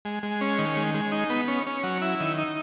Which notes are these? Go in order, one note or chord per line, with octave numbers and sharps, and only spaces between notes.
G#3
G#3
C#4
D#3
G#3
G#3
D#4
B3
C#4
C#4
F#3
E4
D#3
D#4